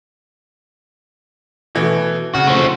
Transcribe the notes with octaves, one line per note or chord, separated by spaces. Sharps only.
B2 E3 A3
C#3 F#4
F3 A3